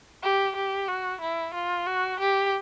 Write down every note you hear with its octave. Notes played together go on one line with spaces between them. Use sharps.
G4
G4
F#4
E4
F4
F#4
G4